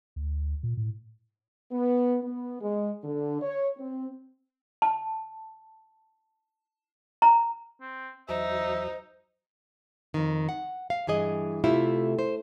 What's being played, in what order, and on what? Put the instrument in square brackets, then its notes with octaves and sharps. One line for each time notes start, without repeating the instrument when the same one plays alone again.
[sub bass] D2
A#2
A2
[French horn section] B3
B3
G#3
D3
C#5
C4
[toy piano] A5
A#5
[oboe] C4
[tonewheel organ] E2 F#3 [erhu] D#4 [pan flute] C5 [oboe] E5
[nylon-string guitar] F2 D#3
F#5
F5
G2 E3 G#4 D#5
C3 A3 E4 F4 G4
C5